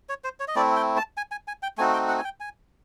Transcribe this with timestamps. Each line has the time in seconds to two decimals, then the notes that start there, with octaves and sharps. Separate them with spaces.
0.09 C#5
0.24 C5
0.40 C#5
0.48 D#5
0.56 A3 C4 E4 D5
0.76 G5
0.97 A5
1.17 G#5
1.31 G#5
1.48 G#5
1.63 G5
1.78 A3 C4 D#4 F#4 G#5
1.93 G5
2.08 F#5
2.18 G#5
2.24 G5
2.40 G#5